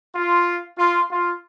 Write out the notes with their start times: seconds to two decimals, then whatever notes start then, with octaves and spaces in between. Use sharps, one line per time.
0.15 F4
0.78 F4
1.10 F4